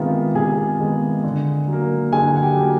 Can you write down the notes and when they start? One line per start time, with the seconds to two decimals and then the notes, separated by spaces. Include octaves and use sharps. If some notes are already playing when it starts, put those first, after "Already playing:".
Already playing: C3 D#3 G#3 B3 F4 E5 F5
0.35 C3 G#4 G#5
0.79 D#3 G#3 B3
1.24 D3
1.68 F#3
1.73 A#3
2.12 D3 G#4 G#5
2.36 F#5
2.42 G4 G5
2.56 F#3
2.62 A#3